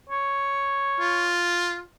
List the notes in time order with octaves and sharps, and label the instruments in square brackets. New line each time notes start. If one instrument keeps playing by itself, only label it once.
[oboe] C#5
[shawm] F4